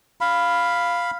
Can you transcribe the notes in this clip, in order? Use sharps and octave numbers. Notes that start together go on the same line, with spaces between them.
F5 B5